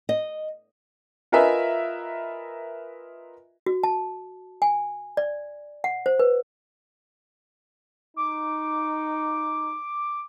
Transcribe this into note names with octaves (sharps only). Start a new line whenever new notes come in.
D#5
F4 A#4 B4 D#5 E5 G#5
F#4
A5
G#5
D5
F#5
C5
B4
D#4 D6